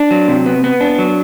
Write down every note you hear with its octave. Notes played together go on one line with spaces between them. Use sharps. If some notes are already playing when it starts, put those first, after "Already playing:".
Already playing: D4
F#3
C3
B3
B3
D4
F#3